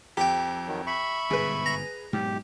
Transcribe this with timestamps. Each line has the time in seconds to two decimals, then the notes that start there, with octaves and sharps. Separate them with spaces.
0.17 F2 G4 G5
0.67 D#3 F#3
0.87 E5 B5 C#6
1.30 G1 G#2 B2 G#4 B4
1.66 A#5
2.13 G#2 B2 F#3 G4